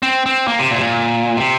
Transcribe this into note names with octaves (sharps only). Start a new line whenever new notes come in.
C4
C4
A#3
C3
A#2
C3
A#2
C3